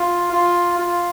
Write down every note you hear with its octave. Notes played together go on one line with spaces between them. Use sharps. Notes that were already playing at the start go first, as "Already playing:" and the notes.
Already playing: F4
F4
F4